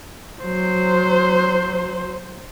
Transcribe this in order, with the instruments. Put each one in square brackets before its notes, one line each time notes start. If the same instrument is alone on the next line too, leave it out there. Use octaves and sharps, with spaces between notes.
[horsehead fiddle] F#3 C5